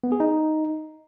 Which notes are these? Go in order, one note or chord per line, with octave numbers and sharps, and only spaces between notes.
B3
G#4
D#4